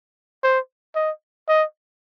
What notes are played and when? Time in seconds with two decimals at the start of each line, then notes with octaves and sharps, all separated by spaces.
0.43 C5
0.95 D#5
1.48 D#5